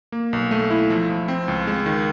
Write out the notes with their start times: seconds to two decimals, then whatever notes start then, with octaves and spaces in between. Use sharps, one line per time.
0.12 A#3
0.33 B1
0.51 A3
0.70 E4
0.90 F3
1.09 F3
1.28 C4
1.48 C#2
1.67 G#3
1.86 D#3